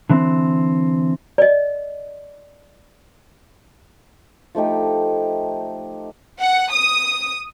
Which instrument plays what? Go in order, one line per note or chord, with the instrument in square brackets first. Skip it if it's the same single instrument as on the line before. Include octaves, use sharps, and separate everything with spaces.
[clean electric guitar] D3 E3 C4
[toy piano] D5 D#5
[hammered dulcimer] F3 A3 D#4 G4
[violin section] F#5
D#6